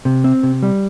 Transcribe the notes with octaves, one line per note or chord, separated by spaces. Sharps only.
C3
C4
C3
G3